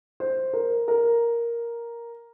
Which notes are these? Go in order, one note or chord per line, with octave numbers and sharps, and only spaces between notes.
C5
A#4
A#4